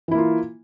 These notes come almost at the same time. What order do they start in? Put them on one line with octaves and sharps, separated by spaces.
E3 E4 A#3 F4